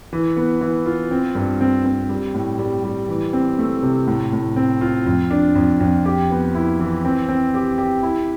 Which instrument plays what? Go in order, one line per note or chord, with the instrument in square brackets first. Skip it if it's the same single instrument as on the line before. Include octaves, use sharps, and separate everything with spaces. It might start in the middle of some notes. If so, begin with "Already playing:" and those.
[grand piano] E3
B3
E3
F4
C4
G2
C4
C4
G3
A2
G3
G3
E3
C4
A3
C3
A2
A2
C4
F4
F2
D4
F2
F2
G4
B3
E4
E3
C4
C4
G4
G4
E4